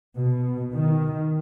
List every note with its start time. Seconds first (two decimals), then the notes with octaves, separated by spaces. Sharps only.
0.16 B2
0.73 D#3